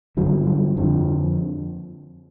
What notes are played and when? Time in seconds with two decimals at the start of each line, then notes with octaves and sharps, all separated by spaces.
0.17 G2 D3 F#3
0.46 F#3
0.76 F2 D3 F3